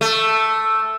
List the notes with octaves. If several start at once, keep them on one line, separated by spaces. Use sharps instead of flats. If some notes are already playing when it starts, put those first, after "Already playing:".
A3